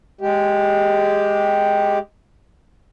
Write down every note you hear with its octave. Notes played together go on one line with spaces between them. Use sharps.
G#3 G4